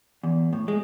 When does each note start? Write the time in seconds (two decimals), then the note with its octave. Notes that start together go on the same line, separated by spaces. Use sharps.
0.23 E2
0.53 A2
0.68 G#3